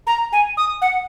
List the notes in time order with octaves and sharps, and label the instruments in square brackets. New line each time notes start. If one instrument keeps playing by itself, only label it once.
[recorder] A#5
G#5
D#6
F#5